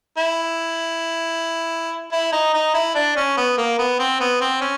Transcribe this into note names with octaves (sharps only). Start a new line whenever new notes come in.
E4
E4
D#4
D#4
E4
D4
C#4
B3
A#3
B3
C4
B3
C4
C#4